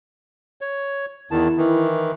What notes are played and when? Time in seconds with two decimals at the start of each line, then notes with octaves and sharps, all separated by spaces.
0.61 C#5
1.31 E2 D#3 E4 A5
1.57 D#3 E3